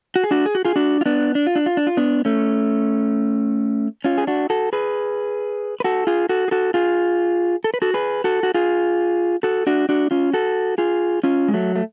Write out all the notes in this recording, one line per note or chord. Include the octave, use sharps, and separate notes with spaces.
F#4
G#4
D4 F#4
G#4
F#4
F4 G#4
D4 F#4
F4
B3 D4
D4
F4
D4
F4
D4
F4
B3 D4
A3 C#4
C#4 F4
G#4
D4 F#4
F#4 A4
G#4 B4
B4
F#4 A4
F4 G#4
F#4 A4
G#4
F#4 A4
F4 G#4
A4
B4
F#4 A4
G#4 B4
F#4 A4
F#4
F4 G#4
F#4 A4
D4 F#4
D4 F#4
C#4 F4
F#4 A4
F4 G#4
C#4 F4
G#3
F#3 A3
A3